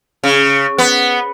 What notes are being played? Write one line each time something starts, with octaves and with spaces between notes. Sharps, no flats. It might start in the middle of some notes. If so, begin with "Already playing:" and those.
C#3
B3